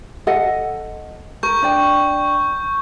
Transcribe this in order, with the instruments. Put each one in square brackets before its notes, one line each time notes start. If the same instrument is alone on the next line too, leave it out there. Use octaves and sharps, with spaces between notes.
[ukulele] A4 D#5 F#5
[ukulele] A#4 [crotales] C#6 G6
[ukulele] D4 D5 G5